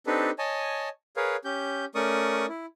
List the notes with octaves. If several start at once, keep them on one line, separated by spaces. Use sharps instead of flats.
C4 D4 D#4 G4 A4 B4
C#5 D#5 G#5 A5
G#4 A#4 B4 C#5 F5
C#4 G4 G6
A3 C#4 A#4 D5 C#6 D#6
E4